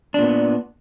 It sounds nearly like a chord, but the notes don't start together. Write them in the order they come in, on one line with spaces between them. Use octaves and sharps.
D4 A#2 B3